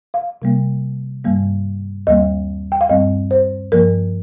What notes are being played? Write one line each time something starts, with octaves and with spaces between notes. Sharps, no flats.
F5
C3 G3 A#3
G2 D#3 G3 A#3
D#2 D#3 G3 A#3 D#5
G5
F5
G2 G3 C4 D#5
C5
G2 F3 A#3 A#4